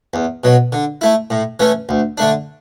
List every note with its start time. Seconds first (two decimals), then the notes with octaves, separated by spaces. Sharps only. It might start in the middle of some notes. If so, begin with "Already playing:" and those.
0.14 E2
0.44 B2 F#3
0.72 D3
1.01 A3 E4
1.30 A2
1.60 E3 A3 C#4
1.89 D2
2.18 D3 A3 D4